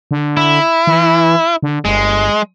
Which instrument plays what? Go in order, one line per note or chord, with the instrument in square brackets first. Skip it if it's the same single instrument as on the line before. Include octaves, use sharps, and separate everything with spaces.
[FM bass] D3
[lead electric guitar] E4
[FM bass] E3
D3
[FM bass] G1 [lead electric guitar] G#3